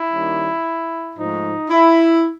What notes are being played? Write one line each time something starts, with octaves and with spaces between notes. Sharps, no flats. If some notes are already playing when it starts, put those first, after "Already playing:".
Already playing: E4
D#3 G3 A#3 C#4
G#2 F3 A3 D#4
E4